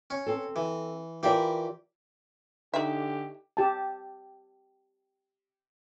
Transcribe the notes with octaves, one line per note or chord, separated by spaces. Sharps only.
C#4
C4 A4
E3
E3 F4 G4 A#4 D5 B5
D3 D#4 G4 E5
G4 A5